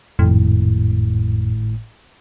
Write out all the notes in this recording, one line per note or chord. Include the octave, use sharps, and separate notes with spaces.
G#1 F2 A2